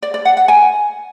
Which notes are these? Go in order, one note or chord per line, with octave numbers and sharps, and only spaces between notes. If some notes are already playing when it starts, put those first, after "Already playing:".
D5
D5
F#5
F#5
G#5